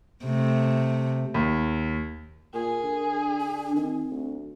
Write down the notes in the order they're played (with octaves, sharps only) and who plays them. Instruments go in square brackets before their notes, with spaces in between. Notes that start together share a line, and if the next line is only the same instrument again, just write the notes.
[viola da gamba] C3 A3
[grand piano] D#2
[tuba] A#2 [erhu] G#4 [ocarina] A#4
[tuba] D3
[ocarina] D4
[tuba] D#3 [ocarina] C4
[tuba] D2